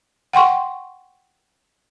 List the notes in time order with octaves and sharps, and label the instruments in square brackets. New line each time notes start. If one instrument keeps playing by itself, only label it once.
[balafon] F#5 G5 C6 C#6